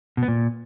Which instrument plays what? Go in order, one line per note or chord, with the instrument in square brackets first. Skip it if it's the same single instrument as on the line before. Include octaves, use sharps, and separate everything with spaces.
[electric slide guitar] B2
B3
A#2